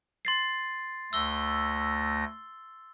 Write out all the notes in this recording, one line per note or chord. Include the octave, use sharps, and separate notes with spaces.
C6 A6 C7
D2 A3 E6 A#6 G7